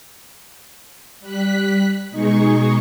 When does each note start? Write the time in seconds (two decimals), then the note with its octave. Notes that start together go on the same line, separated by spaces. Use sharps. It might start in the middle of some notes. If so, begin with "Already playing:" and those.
1.20 G3 F#6 B6
2.10 B2 G#3 D#4 G#4 C#6